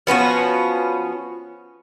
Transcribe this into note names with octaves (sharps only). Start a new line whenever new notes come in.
F3 B3 C#4 F#4